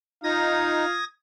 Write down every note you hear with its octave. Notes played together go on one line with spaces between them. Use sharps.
D#4 F4 F5 D#6 G#6 A#6